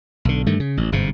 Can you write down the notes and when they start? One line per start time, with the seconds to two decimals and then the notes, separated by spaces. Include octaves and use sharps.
0.25 B1 D3
0.46 G2 D#3 A3
0.60 C#3
0.77 A1
0.92 G1 G#2 C3